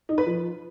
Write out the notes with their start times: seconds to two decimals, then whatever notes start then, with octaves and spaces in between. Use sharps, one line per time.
0.09 D#4
0.18 B4
0.27 F3